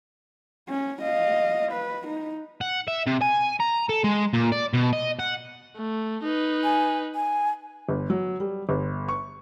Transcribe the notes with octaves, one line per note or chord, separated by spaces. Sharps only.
C#4
D#5 F5
B4
D#4
F#5
E5
C3
G#5
A#5
A4
G#3
A#2
D5
B2
D#5
F#5
A3
D#4 B4
G#5
G#5
G1
F#3
G3
G1
C#6